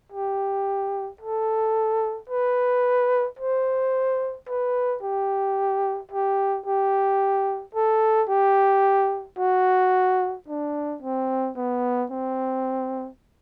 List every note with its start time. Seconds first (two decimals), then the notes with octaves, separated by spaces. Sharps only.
0.12 G4
1.21 A4
2.29 B4
3.39 C5
4.48 B4
5.03 G4
6.11 G4
6.66 G4
7.75 A4
8.29 G4
9.39 F#4
10.48 D4
11.02 C4
11.57 B3
12.11 C4